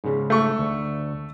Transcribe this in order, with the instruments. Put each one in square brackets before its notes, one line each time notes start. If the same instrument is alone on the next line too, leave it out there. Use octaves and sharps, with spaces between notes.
[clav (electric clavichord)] G#2 C#3
[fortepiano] A3 C#6
[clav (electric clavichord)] D2